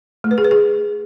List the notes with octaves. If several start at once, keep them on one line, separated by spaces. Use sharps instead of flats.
A3
B4
G#4
B4
G#4